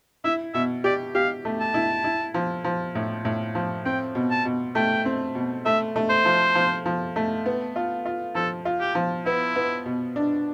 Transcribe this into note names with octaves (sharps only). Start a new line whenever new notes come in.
E4 E5
B2 E5
G4 D5
G4 F5
A3
A5
E4
E4
F3
F3
A2
A2
F3
C4 G5
B2
A5
B2
A3 G5
C4
B2
A3 E5
A3
C5
F3
F3
F3
A3
B3
F4
F4
F3 A4
F4
G4
F3
B3 E4
B3
B2
D4